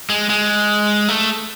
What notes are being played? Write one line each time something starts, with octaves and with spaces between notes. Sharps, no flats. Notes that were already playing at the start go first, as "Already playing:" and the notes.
G#3
G#3
A3